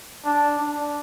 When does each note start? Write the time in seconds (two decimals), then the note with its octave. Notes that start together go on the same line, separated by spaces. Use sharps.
0.25 D4
0.58 D4